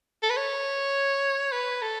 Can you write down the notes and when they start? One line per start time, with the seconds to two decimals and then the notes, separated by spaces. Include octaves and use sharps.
0.23 A4
0.30 B4
0.37 C#5
1.52 B4
1.82 A4